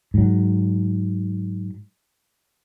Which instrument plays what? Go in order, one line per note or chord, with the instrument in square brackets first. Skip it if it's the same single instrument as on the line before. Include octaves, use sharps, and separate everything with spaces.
[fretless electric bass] G#2 F#3